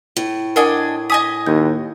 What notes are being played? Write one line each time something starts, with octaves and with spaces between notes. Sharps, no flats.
A2
D4 A#4 D#5 F#5 G#5
D#5 G#5 D#6 B6
D#2 G6